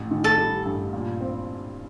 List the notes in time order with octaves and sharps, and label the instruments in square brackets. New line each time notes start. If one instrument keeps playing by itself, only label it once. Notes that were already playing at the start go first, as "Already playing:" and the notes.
Already playing: [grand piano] A1
D#3
[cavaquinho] A4
[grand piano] G3
G2
A#2
C4